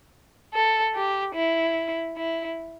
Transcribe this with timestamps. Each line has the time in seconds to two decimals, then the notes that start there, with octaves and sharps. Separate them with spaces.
0.54 A4
0.94 G4
1.35 E4
2.17 E4